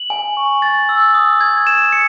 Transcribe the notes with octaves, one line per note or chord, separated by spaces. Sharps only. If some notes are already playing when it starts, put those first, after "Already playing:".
Already playing: F#7
G#5
C#6
A6
E6
D#6
G#6
E7
C#7